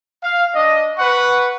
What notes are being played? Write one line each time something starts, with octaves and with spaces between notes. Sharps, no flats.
F5
D4 D#5
B4 F#5 C#6